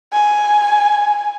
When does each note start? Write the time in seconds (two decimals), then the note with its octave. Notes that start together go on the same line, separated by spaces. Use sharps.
0.13 G#5